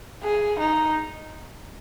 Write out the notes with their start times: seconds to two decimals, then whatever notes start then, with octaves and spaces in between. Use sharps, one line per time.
0.23 G#4
0.59 D#4